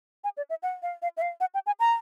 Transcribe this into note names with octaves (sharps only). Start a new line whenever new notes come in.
G#5
D5
E5
F#5
F5
F5
E5
F5
F#5
G5
G#5
A#5